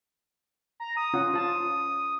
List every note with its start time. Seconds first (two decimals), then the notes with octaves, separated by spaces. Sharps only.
0.80 A#5
0.97 D#6
1.14 C#4 F4 F#5
1.34 F4 A5